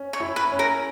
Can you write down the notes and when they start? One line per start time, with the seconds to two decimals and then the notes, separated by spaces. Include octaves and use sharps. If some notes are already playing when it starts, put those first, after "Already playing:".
Already playing: C#4
0.13 C#5
0.20 E4
0.36 B4
0.52 C#4
0.59 A#4